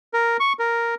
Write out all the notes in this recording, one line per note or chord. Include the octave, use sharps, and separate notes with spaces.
A#4
C#6
A#4